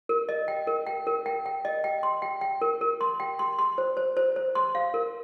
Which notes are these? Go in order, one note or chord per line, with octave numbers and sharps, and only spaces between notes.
A#4
D#5
G5
A#4
G5
A#4
G5
G5
D#5
G5
C6
G5
G5
A#4
A#4
C6
G5
C6
C6
C5
C5
C5
C5
C6
F5
A#4